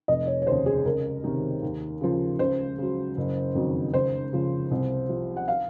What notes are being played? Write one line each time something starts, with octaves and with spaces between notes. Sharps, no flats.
F1 D#5
C#5
C#5
D#2 C#3 C5
G#4
C#2 A#4
C3 D#3
D#2
C#3 F3
C#2 C5
C#3 F#3
F#1
F2 D#3 F#3
C#2 C5
C#3 F3
C2
C3 F3
F#5
F5